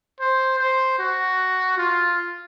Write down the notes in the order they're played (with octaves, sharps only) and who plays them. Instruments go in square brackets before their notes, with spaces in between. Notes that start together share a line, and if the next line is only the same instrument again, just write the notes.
[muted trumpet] C5
C5
F#4
F4